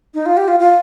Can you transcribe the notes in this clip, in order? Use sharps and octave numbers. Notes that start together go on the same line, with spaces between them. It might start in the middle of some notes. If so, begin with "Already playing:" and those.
D#4
F4
G4
F4
F4